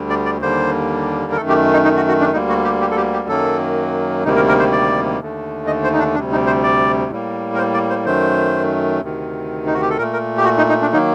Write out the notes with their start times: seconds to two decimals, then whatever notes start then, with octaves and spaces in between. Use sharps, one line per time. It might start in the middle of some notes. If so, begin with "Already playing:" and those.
Already playing: D2 D3 G3
0.10 D5
0.26 D5
0.41 D#2 D3 G3 A#3 C5
1.32 A#4
1.37 F#2 D#3 A3 A4
1.49 G4
1.73 D#4
1.84 D#4
1.97 F#4
2.08 F#4
2.20 D4
2.33 D2 D3 G3 A#3 D#4
2.49 F#4
2.64 G4
2.81 G4
2.91 A4
2.97 G4
3.13 G4
3.29 F#2 D#3 F#3 A#3 A4
4.24 D2 C3 D#3 G3 A#3 D#4
4.36 A#4
4.48 A#4
4.59 C5
4.72 D5
5.20 D#2 D3 A3
5.67 D#5
5.84 C5
5.93 D#4
5.99 D4
6.15 D2 C3 G3 D4
6.32 D#4
6.47 C5
6.63 D5
7.11 A2 G3 A#3
7.54 A#4
7.58 C5
7.74 D5
7.90 C5
8.06 F#2 D#3 F#3 A3 C5
9.02 D2 C3 D#3
9.66 D#4
9.74 F#4
9.81 G4
9.90 A4
9.98 A#2 A3 A#4
10.13 A#4
10.38 G4
10.45 F#4
10.58 D#4
10.69 D#4
10.82 D4
10.92 D#3 F#3 A#3 D#4